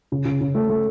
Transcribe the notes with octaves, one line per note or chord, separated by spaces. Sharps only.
C#3
C#3
C#3
A3
A3